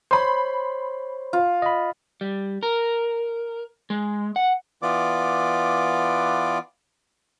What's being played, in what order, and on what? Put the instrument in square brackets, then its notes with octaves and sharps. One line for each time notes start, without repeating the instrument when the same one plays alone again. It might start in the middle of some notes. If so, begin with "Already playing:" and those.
[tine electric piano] C5 C#5 [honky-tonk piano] B5 C6
[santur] F4
[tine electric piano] D#5 B5
[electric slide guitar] G3
A#4
G#3
F#5
[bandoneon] E3 B3 F4 D5 D6